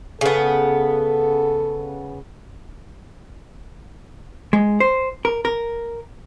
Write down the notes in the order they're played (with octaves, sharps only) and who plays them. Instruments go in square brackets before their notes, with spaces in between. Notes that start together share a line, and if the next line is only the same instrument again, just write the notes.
[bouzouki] C#3 B3 [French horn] A4
[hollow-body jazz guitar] G#3
C5
A#4
A#4